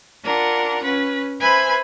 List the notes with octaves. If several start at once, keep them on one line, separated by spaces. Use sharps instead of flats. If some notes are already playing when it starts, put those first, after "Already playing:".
D4 F4 A#4 F#5
C#4 B4
B4 C5 E5 G#5 B5